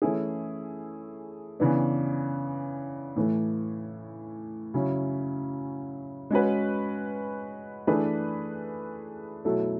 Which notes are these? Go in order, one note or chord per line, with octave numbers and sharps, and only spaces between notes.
E3 A3 C#4 E4 G#4
C#3 E3 B3 D4
A2 E3 A3
C#3 F#3 C#4 E4
G#3 C#4 F#4 B4
E3 A3 D4 G#4 B4
B2 F#3 A3 E4 A4